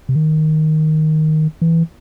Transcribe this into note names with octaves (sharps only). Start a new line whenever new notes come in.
C3
D#3
E3